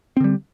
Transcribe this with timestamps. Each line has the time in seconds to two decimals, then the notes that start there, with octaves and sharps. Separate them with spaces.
0.17 C4
0.20 D3
0.24 G3